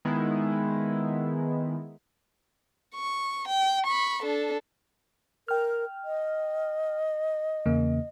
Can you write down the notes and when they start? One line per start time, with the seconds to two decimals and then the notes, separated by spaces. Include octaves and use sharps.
0.05 D#3 G#3 B3 E4
2.95 C#6
3.48 G5
3.86 B5 C#6
4.22 D4 A4
5.48 A#4 G5 F6
6.04 D#5
7.66 E2 C#3 A#3